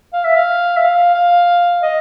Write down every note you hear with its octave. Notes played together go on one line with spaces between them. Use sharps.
F5
E5
F5
E5
F5
F5
D#5